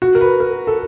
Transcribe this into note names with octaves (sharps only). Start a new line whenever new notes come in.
F#4
A#4
B4
A#4
A4